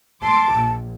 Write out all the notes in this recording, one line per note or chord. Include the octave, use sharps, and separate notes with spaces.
A5 C6 D6
A#1